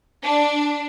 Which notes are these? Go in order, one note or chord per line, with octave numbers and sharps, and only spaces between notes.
D4